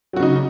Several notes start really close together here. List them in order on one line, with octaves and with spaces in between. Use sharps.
F#3 F#4 C#3 D#4